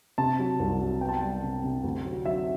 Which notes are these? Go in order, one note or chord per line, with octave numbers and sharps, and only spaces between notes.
C3 A5
F#3
C2
F#3
B3 G5
A5
G3 G5
C3
C3
D2
F#3
F#3 E5